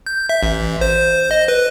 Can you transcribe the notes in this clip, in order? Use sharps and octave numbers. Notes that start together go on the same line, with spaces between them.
G6
E5
A1
C5
D#5
B4